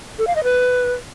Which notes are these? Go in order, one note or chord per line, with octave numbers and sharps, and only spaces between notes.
A4
F5
D#5
B4